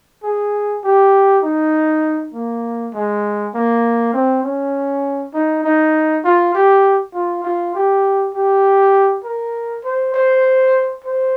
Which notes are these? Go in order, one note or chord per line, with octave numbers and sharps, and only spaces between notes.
G#4
G4
D#4
A#3
G#3
A#3
C4
C#4
D#4
D#4
F4
G4
F4
F4
G4
G4
A#4
C5
C5
C5